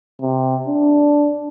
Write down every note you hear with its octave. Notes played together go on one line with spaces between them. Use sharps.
C3
D4